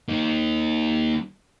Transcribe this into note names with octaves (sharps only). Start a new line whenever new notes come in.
A#3 D#4